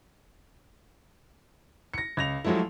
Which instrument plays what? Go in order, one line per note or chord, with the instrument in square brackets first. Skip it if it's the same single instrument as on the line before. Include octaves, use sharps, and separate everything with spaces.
[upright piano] A#6 C#7
C#2 A#6 F7
F3 F#3 G#3 A3 E4